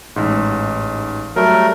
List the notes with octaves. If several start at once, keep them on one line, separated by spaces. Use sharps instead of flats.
A1 G#2
F#3 G3 A3 A#4